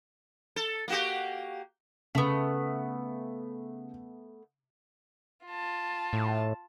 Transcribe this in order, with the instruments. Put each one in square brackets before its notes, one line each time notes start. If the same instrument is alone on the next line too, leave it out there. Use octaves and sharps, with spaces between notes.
[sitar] A4
A#3 F#4 G4
[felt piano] C#3 [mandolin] A3 B3
[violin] F4 A5
[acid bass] A2